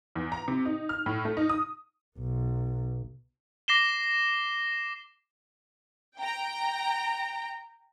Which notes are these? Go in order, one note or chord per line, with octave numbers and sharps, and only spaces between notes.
E2
A#5
C3
D#4
F6
A2
A3
D#4
D#6
B1
D6 A#6 C7 E7 G7
G5 A#5